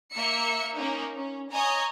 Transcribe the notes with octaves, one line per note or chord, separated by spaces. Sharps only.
A#3 E5 C#7
A#3 C#4 D#4
C#4
C#5 D#5 G#5 A#5